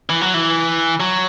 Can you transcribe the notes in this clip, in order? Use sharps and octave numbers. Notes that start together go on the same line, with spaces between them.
E3
F#3
E3
F#3